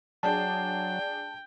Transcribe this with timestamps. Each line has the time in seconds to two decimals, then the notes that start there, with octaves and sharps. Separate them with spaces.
0.23 F#3 D4 G#4 D5 G5 A5